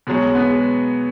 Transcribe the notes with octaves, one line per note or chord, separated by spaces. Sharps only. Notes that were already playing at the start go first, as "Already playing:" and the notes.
B2 F#3 G#3
G#3
B3
G#3